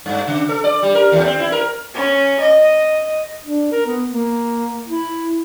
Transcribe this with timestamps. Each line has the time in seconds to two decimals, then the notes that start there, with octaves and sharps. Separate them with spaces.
0.06 G2
0.27 C#3
0.49 A4
0.64 D5
0.83 G3
0.95 A#4
1.12 D#2
1.26 C4
1.40 E4
1.52 A#4
1.94 C#4
2.40 D#5
3.44 D4
3.72 A#4
3.86 B3
4.11 A#3
4.88 E4